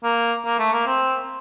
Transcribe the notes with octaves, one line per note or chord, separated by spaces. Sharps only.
A#3
A#3
A3
A#3
C4